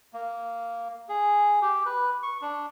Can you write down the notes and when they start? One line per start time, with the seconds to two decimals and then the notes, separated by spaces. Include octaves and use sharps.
0.13 A#3
1.09 G#4
1.62 G4
1.86 B4
2.23 C#6
2.42 D4